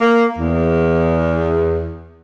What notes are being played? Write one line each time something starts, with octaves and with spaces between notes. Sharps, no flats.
A#3
E2